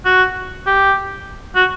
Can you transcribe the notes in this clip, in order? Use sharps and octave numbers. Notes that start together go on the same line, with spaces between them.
F#4
G4
F#4